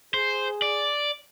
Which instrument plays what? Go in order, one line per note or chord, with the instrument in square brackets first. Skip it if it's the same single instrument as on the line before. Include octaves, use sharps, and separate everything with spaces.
[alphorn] G#4 [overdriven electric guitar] C5
[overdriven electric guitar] D5